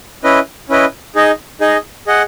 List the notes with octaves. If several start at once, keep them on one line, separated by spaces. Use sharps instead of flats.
C#4 E4 B4 D#5
C#4 E4 B4 D#5
D#4 G#4 D#5
D#4 G#4 D#5
G#4 D#5 F#5